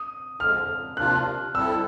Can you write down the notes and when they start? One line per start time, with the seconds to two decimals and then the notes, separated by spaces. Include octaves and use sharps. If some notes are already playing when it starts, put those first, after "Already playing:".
Already playing: D#6
0.40 F2 D3 F3 G#3 F6
0.97 C3 F3 A#3 D4 F4 F#6
1.54 G3 C4 E4 A4 E6